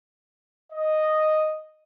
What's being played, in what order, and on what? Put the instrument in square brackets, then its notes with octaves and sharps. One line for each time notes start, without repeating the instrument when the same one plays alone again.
[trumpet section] D#5